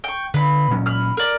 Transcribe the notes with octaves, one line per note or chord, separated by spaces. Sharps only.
G5 C#6
D3 B4 B5
A#2 F#3 C#4
B5 F6
A#4 D5